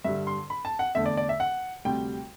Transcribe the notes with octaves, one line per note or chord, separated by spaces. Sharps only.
G2 D3 G3 E5
C6
B5
A5
F#5
E2 D3 A3 E5
D5
D5
E5
F#5
D2 C3 G3 G5